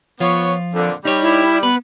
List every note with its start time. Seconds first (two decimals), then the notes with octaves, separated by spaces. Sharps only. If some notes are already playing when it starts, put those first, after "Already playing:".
0.20 F3 B3 F4 C#5
0.74 F2 A#2 D3
1.05 G3 D#4 C#5
1.22 E4
1.63 B3 B4